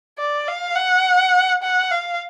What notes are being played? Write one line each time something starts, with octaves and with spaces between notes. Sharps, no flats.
D5
F5
F#5
F#5
F5